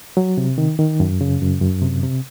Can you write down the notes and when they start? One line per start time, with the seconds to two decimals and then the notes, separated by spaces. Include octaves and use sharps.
0.17 F#3
0.38 C3
0.58 D#3
0.79 D#3
1.00 F#2
1.21 C#3
1.42 F#2
1.61 F#2
1.82 C3
2.03 C3